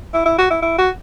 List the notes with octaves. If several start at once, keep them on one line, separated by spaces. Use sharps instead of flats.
E4
E4
F#4
E4
E4
F#4